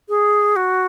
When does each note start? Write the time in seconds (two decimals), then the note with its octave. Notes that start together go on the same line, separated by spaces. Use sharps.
0.09 G#4
0.56 F#4